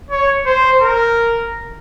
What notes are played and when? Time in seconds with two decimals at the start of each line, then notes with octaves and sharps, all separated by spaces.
0.11 C#5
0.46 C5
0.82 A#4